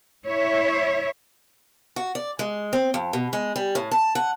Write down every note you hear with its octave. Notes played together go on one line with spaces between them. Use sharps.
E4 C#5 E5
F#4
D5
G#3
C4
F2
B2
G#3
G3
A2
A5
F#5